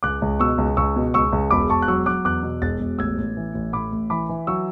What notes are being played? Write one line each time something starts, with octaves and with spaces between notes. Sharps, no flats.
C#2 D6 F#6
C#2
B2 C#6 E6
C#2
C#2 C#6 E6
B2
C#2 C#6 E6
C#2
E1 B5 D6
E1 A5 C#6
F#6
F#3 C#6 E6
F#3 D6 F#6
E2 D6 F#6
B2
E1 F#6 A6
E1
A1 E6 G#6
A1
E3
A1
A2 B5 D6
A1
E3 B5 D6
E3
F#3 C#6 E6